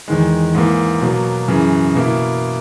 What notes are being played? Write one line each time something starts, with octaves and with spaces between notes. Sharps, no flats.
E2 D#3 G#3
G#2 E3 A#3
B2 F#3 A#3
F#2 C#3 E3
B2 A#3 E4